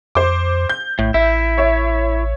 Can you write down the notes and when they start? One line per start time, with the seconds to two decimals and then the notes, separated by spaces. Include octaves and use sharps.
0.15 F2 C5 D6
0.69 G6
0.99 A#1 A2
1.14 A1 E4 E5
1.58 C#5 E5